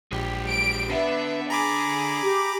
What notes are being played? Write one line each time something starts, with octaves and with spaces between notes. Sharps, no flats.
A#1 G#3 G4
D7
D3 B3 D4 E5
G#4 A#5 B5 D6
G4